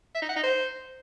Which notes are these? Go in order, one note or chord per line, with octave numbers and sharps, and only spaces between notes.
E5
D#4
F#5
D#4
C5